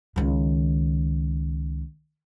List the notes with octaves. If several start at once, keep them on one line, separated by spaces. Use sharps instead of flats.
C#2 D#3